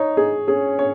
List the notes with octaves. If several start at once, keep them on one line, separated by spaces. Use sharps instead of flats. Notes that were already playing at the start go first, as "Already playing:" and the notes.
Already playing: D#4 C#5
G#4
C#4 G#4
C#5